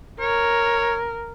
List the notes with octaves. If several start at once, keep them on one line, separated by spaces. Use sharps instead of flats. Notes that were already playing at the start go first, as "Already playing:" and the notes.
A#4 C#5